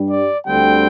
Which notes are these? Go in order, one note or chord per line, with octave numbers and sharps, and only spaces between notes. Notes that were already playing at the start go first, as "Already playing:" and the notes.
Already playing: G2 G3 D4
D5
D2 D3 G3 C4 G5